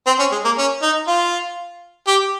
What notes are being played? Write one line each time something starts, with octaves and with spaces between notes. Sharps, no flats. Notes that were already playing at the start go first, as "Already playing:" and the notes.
C4
C#4
G#3
A#3
C#4
D#4
F4
G4